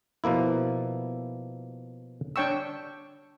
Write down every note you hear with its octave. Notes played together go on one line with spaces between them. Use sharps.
B2 F3 A#3 E4
D4 C#5 G5 C#6 E6